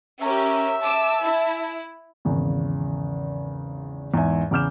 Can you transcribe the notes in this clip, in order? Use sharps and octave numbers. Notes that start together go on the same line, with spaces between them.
C#4 G4 A#4 E5
A5 D6 E6
E4
G#1 E2 C#3
E2 G#2 E5 G#5
E2 C#3 D6 F6 G6 E7